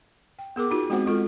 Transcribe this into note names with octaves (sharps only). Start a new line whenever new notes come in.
G5
B3 G#4 A#4 D6
D#4 F4 F#4
G#3 B3 C4 F#4 C5 F#5
G#3 F4 A4